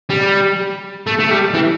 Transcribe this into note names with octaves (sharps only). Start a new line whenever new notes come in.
G3
A3
A3
G3
E3